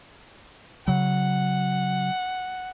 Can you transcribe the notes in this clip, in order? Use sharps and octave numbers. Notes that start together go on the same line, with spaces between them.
C#3 F#3 F#5